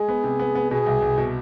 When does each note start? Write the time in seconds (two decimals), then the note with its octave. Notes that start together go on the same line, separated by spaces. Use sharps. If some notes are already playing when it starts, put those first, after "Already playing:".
Already playing: G#3 G#4
0.08 B3
0.24 C3
0.39 B3
0.55 B3
0.71 B2 G#4
0.86 C2
1.02 C2
1.18 B2